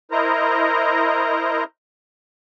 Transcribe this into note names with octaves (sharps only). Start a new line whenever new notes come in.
E4 A#4 C5 D#5 A#5